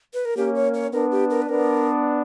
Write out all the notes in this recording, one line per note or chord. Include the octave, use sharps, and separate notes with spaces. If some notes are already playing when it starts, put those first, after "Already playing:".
B4
A#4
A#3 C#4 G4
C#5
C#5
B3 D4 A#4
G4
A#4
B4
B3 D4 A#4